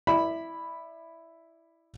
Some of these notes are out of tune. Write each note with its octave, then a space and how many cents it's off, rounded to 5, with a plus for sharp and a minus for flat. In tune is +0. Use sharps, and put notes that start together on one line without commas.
E4 +0 D5 +30 B5 +0